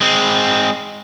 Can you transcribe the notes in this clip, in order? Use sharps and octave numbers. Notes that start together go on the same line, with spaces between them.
G#3 C4